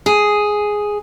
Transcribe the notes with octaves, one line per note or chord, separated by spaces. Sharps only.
G#4